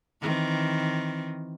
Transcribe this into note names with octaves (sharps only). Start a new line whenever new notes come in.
D#3 E3 C4